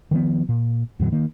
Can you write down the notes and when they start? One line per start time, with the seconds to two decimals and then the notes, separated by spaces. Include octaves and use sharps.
0.11 D#3 F3 B3
0.49 A#2
0.99 E2 A2 D3 F#3
1.12 D#3 A#3